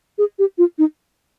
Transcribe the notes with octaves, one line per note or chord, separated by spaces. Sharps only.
G#4
G4
F4
D#4